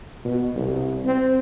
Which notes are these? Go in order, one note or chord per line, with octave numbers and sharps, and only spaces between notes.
B2
C2
C4